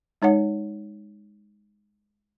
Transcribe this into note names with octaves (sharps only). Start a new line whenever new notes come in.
G#3 D#4 C#5 F#5